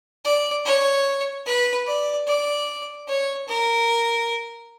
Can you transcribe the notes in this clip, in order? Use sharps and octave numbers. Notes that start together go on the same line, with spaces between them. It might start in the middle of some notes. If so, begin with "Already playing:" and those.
D5
C#5
B4
D5
D5
C#5
A#4